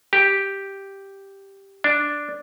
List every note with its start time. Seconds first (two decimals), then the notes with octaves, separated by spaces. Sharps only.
0.13 G4
1.84 D4